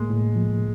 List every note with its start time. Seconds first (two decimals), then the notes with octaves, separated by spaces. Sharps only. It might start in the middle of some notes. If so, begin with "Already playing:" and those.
Already playing: A2 G#3 A#3
0.10 A2
0.36 F3